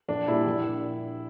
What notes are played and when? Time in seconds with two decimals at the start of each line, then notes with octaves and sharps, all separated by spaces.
0.08 A#1 D4
0.28 A#2 G3 E4
0.46 A#1